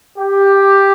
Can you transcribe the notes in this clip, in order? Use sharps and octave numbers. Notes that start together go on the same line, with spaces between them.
G4